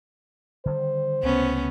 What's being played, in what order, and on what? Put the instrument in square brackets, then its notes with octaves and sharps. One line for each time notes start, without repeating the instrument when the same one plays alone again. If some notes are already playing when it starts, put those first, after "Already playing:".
[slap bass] D3 D#3 G3 [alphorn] C5
[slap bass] C#2 C3 A3 [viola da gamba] B3 C#4